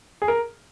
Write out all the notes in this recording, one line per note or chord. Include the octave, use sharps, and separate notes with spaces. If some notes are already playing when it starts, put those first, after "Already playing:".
G#4
A#4